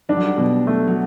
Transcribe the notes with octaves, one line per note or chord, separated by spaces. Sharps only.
G3 D4
F#3
G3
B2
A3
F#3